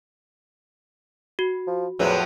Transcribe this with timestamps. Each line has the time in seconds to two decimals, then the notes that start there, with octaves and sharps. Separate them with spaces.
1.39 F#4
1.67 F3
1.99 E2 A2 F3 F#3